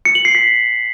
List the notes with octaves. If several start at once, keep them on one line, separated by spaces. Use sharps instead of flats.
C#7
F#7
C7
B6